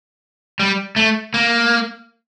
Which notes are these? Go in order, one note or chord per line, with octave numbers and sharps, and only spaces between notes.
G3
A3
A#3